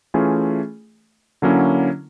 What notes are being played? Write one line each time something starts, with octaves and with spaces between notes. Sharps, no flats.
E3 A3 C#4 F4 G#4
D3 F#3 A#3 C#4 E4